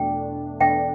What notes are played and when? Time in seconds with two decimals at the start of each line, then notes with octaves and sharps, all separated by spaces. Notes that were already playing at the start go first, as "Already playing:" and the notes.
Already playing: E2 B2 A3 D4 G5
0.60 E2 B2 A3 D4 E5 G5